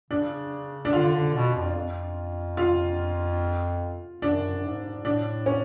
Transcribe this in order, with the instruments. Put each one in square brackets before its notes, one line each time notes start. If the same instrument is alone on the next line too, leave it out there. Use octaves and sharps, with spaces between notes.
[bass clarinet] C#3 [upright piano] D4
[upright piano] D4
[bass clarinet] D3 [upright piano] F4
[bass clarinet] D3
B2
F2
F2
[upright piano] F4
[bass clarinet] F#2 [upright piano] D4
[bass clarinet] G#2
[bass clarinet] A2 [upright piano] D4
[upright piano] C#4